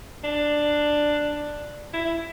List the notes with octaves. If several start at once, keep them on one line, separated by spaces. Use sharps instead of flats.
D4
E4